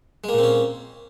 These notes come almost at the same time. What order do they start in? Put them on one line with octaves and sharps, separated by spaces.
G#3 A#3 A#2 C4 C#4